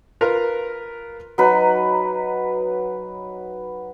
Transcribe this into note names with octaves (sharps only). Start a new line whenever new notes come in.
F4 A#4 B4 A#5
F#3 D#4 B4